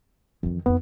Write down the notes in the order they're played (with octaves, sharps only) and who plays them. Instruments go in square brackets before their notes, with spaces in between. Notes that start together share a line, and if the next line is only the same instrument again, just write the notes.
[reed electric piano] F2 [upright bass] D#3 E3
[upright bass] F2 D#4 [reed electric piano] B3